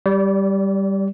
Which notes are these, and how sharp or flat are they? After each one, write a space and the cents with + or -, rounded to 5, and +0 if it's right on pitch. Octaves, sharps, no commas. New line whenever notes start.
G3 +0 D5 -35